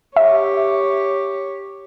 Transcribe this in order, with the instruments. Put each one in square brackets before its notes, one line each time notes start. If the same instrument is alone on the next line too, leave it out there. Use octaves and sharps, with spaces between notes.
[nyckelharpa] G4 C#5 [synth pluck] E5